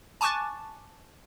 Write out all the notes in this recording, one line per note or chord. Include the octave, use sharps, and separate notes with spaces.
G#5 A5 C#6 D6 F#6 A6